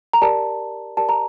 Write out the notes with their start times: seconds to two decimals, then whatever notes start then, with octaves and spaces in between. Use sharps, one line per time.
0.13 A#5
0.21 G4 A#4 D5 A5
0.97 G4 A#4 D5 A5
1.09 A#5